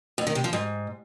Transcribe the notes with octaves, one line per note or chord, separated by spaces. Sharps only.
F2
D#3
C3
F3
G#2